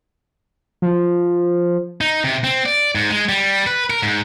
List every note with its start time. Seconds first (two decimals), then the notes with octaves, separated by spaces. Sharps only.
0.82 F3
2.01 D#4
2.24 C3
2.44 C4
2.66 D5
2.95 G#2
3.10 G#3
3.29 G3
3.67 B4
3.90 A#4
4.02 G#2